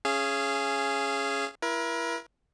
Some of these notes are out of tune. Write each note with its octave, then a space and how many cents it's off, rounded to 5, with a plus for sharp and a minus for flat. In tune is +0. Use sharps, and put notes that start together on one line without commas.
C#4 +0 G#4 +0 F5 -30
E4 +25 A#4 +40